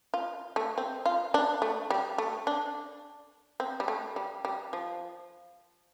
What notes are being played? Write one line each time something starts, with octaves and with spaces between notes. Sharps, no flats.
F4
A3
C4
F4
D4
A3
G3
A3
D4
C4
G3
A3
G3
G3
F3